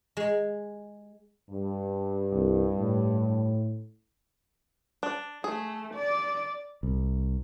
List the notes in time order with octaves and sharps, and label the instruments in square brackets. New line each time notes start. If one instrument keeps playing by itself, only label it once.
[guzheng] G#3
[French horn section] G2
[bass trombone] C2
A2
[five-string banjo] D4
[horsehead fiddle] A3 [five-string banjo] G#4
[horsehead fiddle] D5
[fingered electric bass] C2